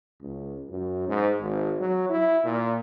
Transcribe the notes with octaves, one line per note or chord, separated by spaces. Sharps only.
C#2
F#2
G#2
G#1
F#3
E4
A#2